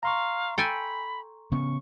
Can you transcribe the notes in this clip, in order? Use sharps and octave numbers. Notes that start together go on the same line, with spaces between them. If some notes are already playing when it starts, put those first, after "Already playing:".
F5 A#5 C6 C#6
A4 G5 G#5 B5
C#3 B3 C#4 C#6